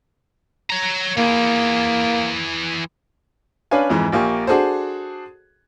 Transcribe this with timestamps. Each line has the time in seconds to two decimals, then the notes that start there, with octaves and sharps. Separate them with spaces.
0.70 C#5 A#5
1.18 E3 A#3 G#4
3.71 C#4 D4 B4 C#5 F5 G#5
3.89 F2 G#2 E3
4.12 A#1 A#3 G4 G#5 C#6
4.47 D4 F#4 G#4 A4 C5